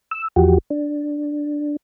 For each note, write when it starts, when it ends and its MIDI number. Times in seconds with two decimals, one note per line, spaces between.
0.11 0.28 88
0.36 0.58 40
0.36 0.58 53
0.36 0.58 66
0.36 0.58 67
0.70 1.76 62